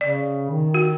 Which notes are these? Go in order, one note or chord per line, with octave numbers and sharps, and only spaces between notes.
C#3 D5
D#3
F#4